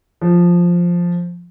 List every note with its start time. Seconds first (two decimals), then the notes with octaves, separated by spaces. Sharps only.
0.21 F3